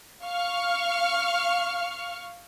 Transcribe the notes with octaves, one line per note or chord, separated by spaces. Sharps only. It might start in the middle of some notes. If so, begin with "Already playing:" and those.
F5 C#6 F6